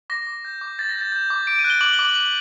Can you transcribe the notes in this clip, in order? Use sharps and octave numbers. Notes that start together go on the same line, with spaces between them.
D6 A#6
D6
G6
D6
G6 A6
A#6
G6
A6
G6
D6
D6 D7
D#7
F#6
G7
D6 F#7
G7
D6
F#7
D6 F#7